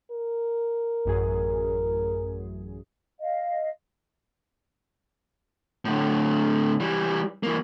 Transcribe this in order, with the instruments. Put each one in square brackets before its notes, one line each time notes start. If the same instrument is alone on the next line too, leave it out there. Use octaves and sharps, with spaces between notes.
[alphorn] A#4
[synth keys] A1 F#2 G#4
[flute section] D#5 F5
[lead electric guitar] A2 D3
E3 G3
E3 A#3